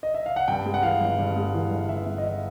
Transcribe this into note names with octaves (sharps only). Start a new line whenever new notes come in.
D#5
E5
F5
F#5
G2 G5
G#3
F#5
E3 F5
G1
G2
G#3
E3
G1
G2 E5
G#3
D#5
E3 E5